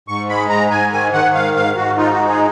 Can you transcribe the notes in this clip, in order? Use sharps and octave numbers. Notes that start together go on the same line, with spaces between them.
G#2 C#6
G#3 B5
G#2 A#5
G#2 G#5
D#3 G#5
D#3 F#5
G#2 F5
G#2 F5
G#2 F#4
D#4 F4
F#4
G#3
G#4